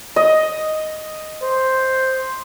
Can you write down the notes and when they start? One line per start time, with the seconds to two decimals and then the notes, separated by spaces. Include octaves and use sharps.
0.16 D#5
1.43 C5